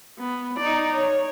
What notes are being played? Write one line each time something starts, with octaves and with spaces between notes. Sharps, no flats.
B3
D#4 D5
C#5